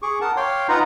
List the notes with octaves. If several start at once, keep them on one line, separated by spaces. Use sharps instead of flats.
G#4 C#6 D6
A#4 F#5 A5
C#5 F5 G5 C6 D6
D#4 F4 B4 F#5 A#5